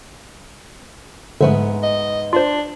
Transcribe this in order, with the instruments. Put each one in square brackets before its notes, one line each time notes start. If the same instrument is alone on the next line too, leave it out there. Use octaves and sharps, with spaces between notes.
[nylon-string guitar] G#2 B3 E5 [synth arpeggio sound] D3 F3 A3
[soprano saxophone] D#5
[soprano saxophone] D4 [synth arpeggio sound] F4 C5